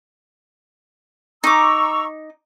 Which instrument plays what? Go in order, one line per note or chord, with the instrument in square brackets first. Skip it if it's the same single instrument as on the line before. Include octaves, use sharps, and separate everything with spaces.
[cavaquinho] D#4 D6 [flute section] A#5 C#6 E6